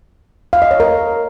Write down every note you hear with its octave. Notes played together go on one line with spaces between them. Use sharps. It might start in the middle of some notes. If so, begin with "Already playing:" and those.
F5
D#5
C#5
A#4